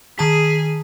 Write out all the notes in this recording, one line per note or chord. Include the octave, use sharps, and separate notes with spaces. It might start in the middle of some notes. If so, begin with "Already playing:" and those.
D#3 G#4 A5 B6